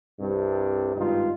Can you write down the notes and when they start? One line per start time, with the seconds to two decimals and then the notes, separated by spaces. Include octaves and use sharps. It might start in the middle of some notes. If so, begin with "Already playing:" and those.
0.20 C2 G2 C3
0.96 G#1 G2 D#4 F4